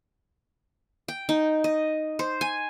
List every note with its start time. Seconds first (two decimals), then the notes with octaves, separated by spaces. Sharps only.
1.08 G5
1.29 D#4
1.64 D#5
2.19 C5
2.41 G#5